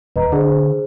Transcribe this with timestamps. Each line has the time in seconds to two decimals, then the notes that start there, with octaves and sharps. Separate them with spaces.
0.16 D#1 B4 D#5 A#5
0.32 D3 G#4 C5